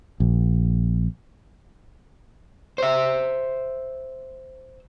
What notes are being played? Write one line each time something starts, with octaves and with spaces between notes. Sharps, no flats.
A#1
C5 E5